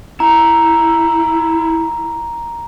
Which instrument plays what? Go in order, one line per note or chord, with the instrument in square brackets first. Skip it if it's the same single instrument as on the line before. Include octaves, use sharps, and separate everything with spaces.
[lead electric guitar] E4 [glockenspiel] A#5